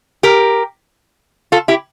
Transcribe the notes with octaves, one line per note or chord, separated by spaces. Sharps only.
G4 A#4
F4 A4
E4 G4